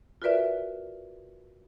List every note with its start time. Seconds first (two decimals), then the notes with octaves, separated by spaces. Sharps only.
0.22 F4 F#4 A#4 B4 D5 E5